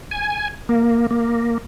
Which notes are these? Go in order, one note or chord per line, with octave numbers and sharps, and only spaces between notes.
G#5
A#3
A#3